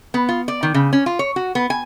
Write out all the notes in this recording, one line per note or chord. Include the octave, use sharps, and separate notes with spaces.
B3
F4
D5
D#3
C#3
C#4
F4
C#5
F#4
B3
G#5